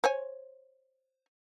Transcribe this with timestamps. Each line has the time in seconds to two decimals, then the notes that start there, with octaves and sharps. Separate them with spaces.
0.04 C5 C#5 G#5